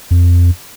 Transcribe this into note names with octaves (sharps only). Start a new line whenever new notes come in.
F2